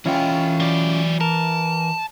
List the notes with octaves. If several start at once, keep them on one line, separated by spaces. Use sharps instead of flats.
E3 C#4 E4 F4 G5
F#3 D5
A#4 A5